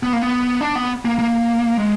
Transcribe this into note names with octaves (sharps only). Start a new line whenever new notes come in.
B3
A#3
B3
D4
B3
A#3
A#3
G#3